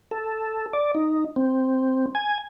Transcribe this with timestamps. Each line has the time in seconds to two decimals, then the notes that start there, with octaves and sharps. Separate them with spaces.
0.11 A4
0.73 D5
0.95 D#4
1.36 C4
2.15 G#5